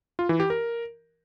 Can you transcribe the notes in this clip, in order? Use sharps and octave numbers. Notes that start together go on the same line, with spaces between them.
F4
E3
G4
A#4